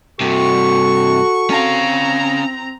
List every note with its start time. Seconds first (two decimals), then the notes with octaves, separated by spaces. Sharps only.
0.21 G2 C3 F#4 A4 C#6
1.50 C4 C#4 F5 A#5